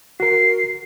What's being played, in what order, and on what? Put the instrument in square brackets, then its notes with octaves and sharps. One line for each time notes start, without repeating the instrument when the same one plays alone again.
[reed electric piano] F#4 A#4 [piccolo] C7